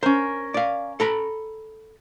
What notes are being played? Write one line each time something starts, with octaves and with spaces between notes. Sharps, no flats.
C#4 A#4 C5
D5 F5
A4 A#5 B5